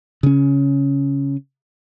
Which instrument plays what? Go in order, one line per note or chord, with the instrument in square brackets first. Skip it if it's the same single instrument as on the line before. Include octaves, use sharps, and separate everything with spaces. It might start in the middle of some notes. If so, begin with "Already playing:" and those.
[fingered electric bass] C#3 C#4